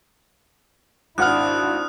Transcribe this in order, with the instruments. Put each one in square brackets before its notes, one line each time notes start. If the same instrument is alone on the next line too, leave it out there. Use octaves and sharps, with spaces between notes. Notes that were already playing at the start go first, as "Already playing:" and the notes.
[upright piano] G#1 F#5 F6 [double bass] D4 E4 [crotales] D#6 F#6